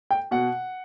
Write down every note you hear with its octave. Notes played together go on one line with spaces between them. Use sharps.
G5
B2 F#5